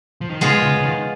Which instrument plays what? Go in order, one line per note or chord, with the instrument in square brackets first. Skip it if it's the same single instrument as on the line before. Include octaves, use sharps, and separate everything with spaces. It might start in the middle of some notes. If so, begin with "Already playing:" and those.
[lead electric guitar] F3
D#3
[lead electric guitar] C#3 [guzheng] G#3 B3 F4
[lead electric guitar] C#3
C#3
D#3